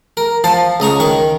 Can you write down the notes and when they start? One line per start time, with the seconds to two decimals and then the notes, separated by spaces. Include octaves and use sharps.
0.17 A#4
0.44 F3 C5 A5
0.80 C#2 D#5 A#5 C#6
1.00 D#3 C#6